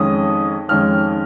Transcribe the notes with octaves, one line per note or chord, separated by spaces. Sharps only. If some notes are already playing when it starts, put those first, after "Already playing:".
Already playing: F2 D#3 G#3 C#4 D#6
F2 D#3 G#3 C#4 F6